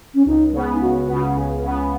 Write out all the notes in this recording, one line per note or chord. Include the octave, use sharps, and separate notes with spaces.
C#4
C#2 D#4
C#3 B3
D#4
C#2 F#4
C#3 B3
C#2
C#3 B3